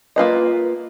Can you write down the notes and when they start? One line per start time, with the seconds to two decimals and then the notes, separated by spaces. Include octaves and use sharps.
0.16 A#3 F4 B4 D#5